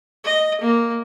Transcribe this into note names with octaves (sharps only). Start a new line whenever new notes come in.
D#5
A#3